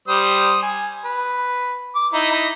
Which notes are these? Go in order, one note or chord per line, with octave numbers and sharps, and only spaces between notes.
G3 C5 D#6
G#5
B4
D6
D#4 E4 D#5